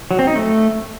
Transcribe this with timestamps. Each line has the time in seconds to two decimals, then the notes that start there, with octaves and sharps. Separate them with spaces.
0.11 F#3
0.19 C4
0.27 D#4
0.36 A3